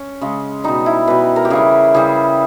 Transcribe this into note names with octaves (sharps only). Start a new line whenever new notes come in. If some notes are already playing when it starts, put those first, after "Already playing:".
Already playing: C#4
C#3 G#3
B2 G3 D#4
E4
B2 G3 B4
A#4
G4
C#3 E3 G3 G#4
C#3 E3 G3 G#4